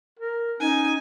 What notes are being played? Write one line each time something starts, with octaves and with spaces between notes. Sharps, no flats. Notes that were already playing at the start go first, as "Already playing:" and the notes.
A#4
C#4 D#4 G#5